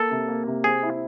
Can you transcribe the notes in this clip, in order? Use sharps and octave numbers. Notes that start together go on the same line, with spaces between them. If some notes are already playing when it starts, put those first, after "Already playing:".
Already playing: A#3 A4
C3
A#3
C3
C4 G#4
E4